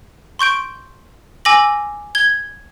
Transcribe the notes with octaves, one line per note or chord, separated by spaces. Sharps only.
C6 C#6 G6 D7
G#5 D6 E6 A#6 F#7
G#6 G7